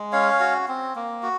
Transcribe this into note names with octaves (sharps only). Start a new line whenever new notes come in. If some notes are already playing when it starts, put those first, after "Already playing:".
Already playing: G#3
C#4 C#5 F5
F#4
C4
A#3
F#4